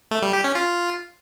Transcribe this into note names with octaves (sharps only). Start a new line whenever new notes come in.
A3
G3
G4
C#4
F4